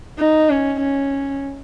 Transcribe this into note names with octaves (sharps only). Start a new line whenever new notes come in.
D#4
C#4
C#4